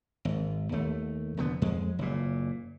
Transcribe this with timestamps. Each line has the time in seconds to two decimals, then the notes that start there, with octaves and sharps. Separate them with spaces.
0.25 G#1
0.72 D#2 A3
1.37 F1 D3 B3
1.62 F2 G#3
1.99 F#1 A#2